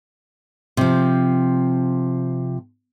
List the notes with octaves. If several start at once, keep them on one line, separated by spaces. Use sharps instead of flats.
C3 F3